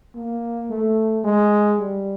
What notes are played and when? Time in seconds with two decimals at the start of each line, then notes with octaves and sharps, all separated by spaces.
0.15 A#3
0.70 A3
1.24 G#3
1.79 G3